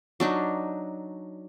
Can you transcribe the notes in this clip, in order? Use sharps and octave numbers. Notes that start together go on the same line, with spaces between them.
F#3 D4 D#4